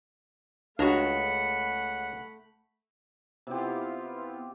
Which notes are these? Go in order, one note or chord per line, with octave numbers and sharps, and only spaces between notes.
C#2 G#3 A3 D4 F#4 F#5 A#5 B5
C3 B3 E4 F4 G4